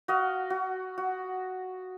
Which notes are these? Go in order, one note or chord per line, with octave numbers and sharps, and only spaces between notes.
F#4 D#5 F5
F#4
F#4